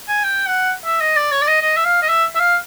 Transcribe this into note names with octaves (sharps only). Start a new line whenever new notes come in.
G#5
G5
F#5
E5
D#5
D5
C#5
D5
D#5
D#5
E5
F5
D#5
E5
E5
F5